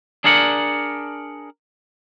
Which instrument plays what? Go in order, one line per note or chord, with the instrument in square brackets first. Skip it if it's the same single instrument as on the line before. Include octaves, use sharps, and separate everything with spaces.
[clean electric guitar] D4 G#4 A#4 D5 F#5